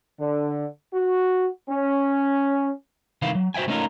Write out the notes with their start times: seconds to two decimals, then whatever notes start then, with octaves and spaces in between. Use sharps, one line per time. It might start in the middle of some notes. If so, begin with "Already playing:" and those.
0.18 D3
0.93 F#4
1.69 C#4
3.22 C2 D#3 E3 E4 F5
3.35 F#3
3.54 F#4 C5 E5 G5 G#5
3.68 A3 B3 C#4 D#4 F4 A#4